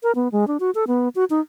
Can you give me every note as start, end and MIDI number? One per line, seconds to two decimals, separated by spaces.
0.03 0.12 70
0.15 0.28 59
0.32 0.47 56
0.48 0.57 62
0.60 0.71 66
0.75 0.85 69
0.87 1.09 59
1.15 1.25 66
1.30 1.41 63